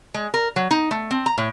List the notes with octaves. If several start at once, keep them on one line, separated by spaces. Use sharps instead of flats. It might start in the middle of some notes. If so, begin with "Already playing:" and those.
G#3
A#4
F#3
D#4
A3
C4
A#5
A2